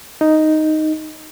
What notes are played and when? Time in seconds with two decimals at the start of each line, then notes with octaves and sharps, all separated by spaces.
0.21 D#4